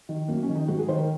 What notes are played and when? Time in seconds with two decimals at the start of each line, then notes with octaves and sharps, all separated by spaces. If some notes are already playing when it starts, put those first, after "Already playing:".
0.09 D#3
0.28 F#2 A#3
0.43 C#4
0.49 D#3
0.55 D#4
0.68 G#2 F#4
0.79 G#4
0.88 D#3 C5
0.98 A#4